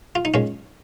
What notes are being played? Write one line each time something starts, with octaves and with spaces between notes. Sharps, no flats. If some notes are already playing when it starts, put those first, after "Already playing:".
F4
D#4
A#2 G#3 C#4